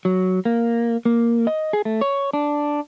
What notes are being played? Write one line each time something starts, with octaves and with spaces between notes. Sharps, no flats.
F#3
A#3
A#3
D#5
G#4
A3
C#5
D4